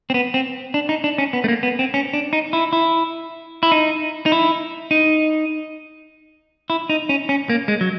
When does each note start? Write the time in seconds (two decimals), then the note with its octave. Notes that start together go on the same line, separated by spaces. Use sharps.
0.10 C4
0.14 B3
0.34 C4
0.74 D4
0.89 D#4
1.04 D4
1.18 C#4
1.33 B3
1.44 A3
1.48 A#3
1.63 B3
1.79 C4
1.94 C#4
2.13 D4
2.33 D#4
2.53 E4
2.73 E4
3.63 E4
3.72 D#4
4.26 D#4
4.32 E4
4.91 D#4
6.70 E4
6.89 D#4
7.09 C#4
7.29 C#4
7.49 A#3
7.68 G#3
7.81 F#3